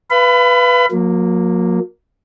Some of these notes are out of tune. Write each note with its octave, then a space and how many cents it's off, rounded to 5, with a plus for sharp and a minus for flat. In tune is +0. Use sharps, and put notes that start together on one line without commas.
B4 +0 F5 -30 B5 +30
F#3 -45 A#3 +0